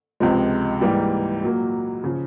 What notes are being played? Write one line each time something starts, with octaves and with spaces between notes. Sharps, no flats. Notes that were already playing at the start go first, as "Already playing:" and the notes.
C#2 C3 F3 G#3
G#2 E3 G3 A#3
A#2 F#3 A#3
C#3 F3